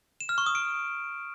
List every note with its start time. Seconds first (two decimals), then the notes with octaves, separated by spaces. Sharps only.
0.20 E7
0.29 F6
0.38 C#6
0.46 D#6
0.55 D7